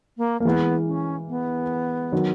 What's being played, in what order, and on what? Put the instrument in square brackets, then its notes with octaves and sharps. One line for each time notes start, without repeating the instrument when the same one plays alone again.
[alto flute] A#3
[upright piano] A#3
[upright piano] E3 G#3 [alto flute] B3
[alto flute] C#4
B3
[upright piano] D#3 F#3